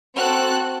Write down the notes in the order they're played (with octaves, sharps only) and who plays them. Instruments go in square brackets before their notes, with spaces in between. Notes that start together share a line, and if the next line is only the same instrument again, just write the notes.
[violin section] C4 F#4 A4 F#6